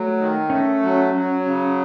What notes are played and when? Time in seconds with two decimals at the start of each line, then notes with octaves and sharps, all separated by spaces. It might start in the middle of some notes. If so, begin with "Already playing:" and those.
Already playing: F#3 A3
0.17 D#3
0.49 A3 C#4
0.82 F#3
1.14 F#3
1.45 C#3